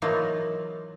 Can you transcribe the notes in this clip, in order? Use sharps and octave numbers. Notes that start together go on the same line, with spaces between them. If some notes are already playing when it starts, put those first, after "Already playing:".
E3 F#3 A#3 D#4 F4